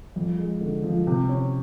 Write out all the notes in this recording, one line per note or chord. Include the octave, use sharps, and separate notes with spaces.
F2
G#3
D3
F3
C3
C#4